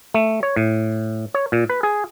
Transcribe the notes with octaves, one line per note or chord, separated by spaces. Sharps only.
A3
C#5
A2
C#5
A#2
B4
G#4